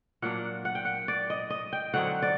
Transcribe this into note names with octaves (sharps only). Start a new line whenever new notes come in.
A#2 F#3 A#3 D4 F#5
F#5
G5
F#5
D5
D#5
D#5
G5
D3 F#3 C4 D#4 F#5
D5